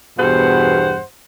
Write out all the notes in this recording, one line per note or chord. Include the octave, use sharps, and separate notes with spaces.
E2 G2 B2 G#4 C5 F#5